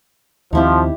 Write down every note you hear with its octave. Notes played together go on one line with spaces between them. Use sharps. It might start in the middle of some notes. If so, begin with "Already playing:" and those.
D#2 F3 C4 D#4 E4 G4